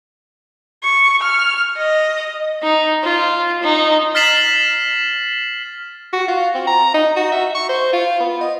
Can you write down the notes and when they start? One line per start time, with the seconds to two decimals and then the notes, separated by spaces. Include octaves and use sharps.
0.83 C#6
1.22 F6
1.77 D#5
2.63 D#4
3.03 F4
3.63 D#4
4.15 F6 A6 B6 C7 E7 F#7
6.13 F#4
6.28 F4
6.55 C4
6.67 A#5
6.94 D#4
7.16 F#4
7.32 E5
7.55 C#6
7.69 C5
7.93 F4
8.20 B3
8.41 D#5